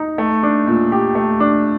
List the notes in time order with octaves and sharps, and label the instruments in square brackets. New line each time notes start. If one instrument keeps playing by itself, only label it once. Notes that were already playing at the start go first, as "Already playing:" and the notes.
Already playing: [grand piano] D#4
A3
D4
A#2
G4
A3
D4